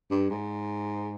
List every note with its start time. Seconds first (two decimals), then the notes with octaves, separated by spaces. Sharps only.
0.10 G2
0.30 G#2